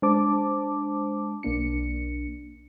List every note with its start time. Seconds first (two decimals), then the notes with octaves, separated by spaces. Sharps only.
0.02 G#3 D4 C5 A5 D6
1.43 B1 A#3 D4 C#7